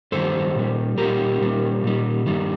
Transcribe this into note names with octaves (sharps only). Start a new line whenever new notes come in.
G2 D#3 G3 A4 C5
A#2 G3
A#2 G3 G4 A#4
A#2 G3
A#2 G3
G2 D#3 G3